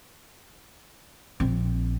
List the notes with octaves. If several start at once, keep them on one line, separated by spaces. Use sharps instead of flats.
A#1 C4